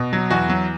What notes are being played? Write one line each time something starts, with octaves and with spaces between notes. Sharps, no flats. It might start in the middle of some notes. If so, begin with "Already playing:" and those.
Already playing: B2
F#3
E2 F#4
F#3